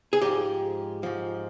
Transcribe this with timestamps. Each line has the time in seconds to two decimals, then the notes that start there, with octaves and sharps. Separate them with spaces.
0.13 G#4
0.21 G#2 F3 G4
1.03 G#2 F3